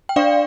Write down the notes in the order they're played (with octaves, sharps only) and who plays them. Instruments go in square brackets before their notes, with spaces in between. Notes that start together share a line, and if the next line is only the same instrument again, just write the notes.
[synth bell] G5
D4 D5 F5